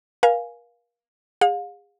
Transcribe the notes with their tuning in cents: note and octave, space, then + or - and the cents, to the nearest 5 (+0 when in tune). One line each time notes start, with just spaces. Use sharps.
A#4 +35 F5 +0 G#5 +0
G#4 -35 F5 +35